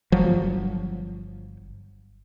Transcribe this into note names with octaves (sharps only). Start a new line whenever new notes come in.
G1 F3 F#3